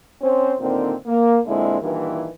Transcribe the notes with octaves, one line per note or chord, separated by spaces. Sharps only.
C4 C#4 C5
A#2 D3 D#3 C4
A#3
A#2 D3 G#3 C4 E4
G2 A#2 D#3 E3